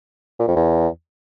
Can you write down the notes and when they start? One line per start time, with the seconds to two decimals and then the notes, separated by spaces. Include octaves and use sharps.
0.40 A#2
0.48 F2
0.56 E2